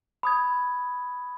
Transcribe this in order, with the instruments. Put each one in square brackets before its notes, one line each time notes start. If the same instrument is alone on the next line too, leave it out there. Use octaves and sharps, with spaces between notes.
[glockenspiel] B5 D#6 G#6